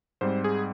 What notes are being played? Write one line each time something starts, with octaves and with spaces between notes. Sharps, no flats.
G#2 G3 C4 C5
G#4